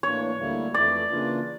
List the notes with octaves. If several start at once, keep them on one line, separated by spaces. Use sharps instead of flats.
A2 E3 A#3 D4 C#5
D2 D3 G3 A#3 E4
F2 E3 A3 E4 D5
C#3 E3 A#3 D4 F4